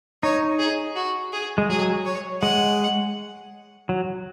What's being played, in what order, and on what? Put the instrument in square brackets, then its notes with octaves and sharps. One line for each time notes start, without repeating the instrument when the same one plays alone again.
[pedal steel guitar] D#4 [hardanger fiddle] C#5
[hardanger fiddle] G#4
F#4
G#4
[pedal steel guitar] G#3
[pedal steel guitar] F#3 [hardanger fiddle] G#4
[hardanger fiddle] C#5
[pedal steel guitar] G#3 [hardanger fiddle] F#5
[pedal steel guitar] F#3